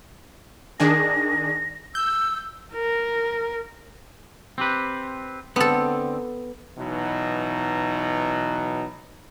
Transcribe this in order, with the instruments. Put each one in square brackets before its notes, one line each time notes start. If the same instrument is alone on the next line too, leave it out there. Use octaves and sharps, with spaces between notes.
[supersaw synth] D#3 D4 G#4 [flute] A#6
[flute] E6 [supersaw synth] G6
[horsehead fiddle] A#4
[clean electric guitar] C4 G4 B4
[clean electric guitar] D3 C4 [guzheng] B3 A4
[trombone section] B2 E3 F#3 D#4